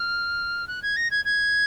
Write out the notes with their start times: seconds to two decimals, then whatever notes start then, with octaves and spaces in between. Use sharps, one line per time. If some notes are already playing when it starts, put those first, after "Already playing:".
Already playing: F6
0.68 F#6
0.82 G#6
0.96 A#6
1.11 G#6
1.25 G#6